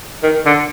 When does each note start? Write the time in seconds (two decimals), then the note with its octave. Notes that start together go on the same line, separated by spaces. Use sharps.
0.23 D#3
0.46 D3